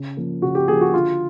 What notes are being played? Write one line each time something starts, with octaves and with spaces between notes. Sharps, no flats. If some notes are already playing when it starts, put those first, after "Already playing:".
Already playing: C#3
F3 A#3
C#3 F#4
G4
F3 A#3 G#4
F#4
D3 F4